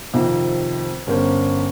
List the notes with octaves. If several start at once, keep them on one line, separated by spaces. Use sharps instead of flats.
F2 C3 D#3
G1 C#4 A#4 C5